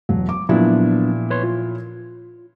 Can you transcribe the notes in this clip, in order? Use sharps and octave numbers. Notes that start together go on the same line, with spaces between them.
E1 F#3
D6
A#2 F3 F#3 B3 D4 E4
B4 C#5 C6
F4